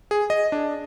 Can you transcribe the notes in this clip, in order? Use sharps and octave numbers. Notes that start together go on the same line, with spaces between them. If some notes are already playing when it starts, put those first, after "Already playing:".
G#4
D#5
D4